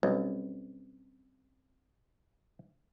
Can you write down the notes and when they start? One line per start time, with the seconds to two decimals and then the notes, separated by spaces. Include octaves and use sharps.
0.03 B1 G3 C4 C#4